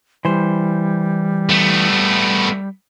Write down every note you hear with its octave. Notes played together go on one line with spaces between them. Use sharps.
E3 G3 C5
A3 B3